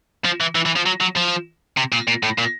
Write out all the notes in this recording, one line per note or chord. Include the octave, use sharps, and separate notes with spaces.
F3
E3
E3
E3
F3
F#3
F#3
F3
C3
A#2
A#2
A2
A#2